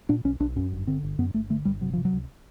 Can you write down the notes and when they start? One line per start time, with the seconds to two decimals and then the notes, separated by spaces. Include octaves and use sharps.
0.09 A#2 D4
0.24 B1 C#4
0.40 B1 D4
0.56 F#2 C#4
0.72 G1
0.87 D3 C4
1.03 G1
1.19 F#2 B3
1.34 G1 A3
1.50 D3 A3
1.65 G1 G3
1.81 C3 F#3
1.93 C3 F3
2.05 F#3
2.13 C#2